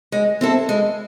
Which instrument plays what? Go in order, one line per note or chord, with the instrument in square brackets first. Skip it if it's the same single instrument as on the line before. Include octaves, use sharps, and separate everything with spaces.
[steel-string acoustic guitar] G#3
C4 E4 A4
G#3